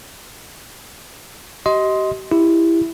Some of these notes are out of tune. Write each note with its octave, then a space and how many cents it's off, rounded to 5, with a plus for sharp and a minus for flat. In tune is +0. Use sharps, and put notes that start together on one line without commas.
G4 -35 D#5 +20 C6 +0
E4 +5 G4 +20